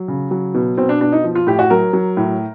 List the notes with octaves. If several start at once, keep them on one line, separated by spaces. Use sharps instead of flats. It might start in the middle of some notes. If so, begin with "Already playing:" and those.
Already playing: F#3
C#3
F#3
B2
B2 C4
D4
B2 D4
D#4
F3
F4
A2 G4
F#4
F#3 A#4
F#3
A2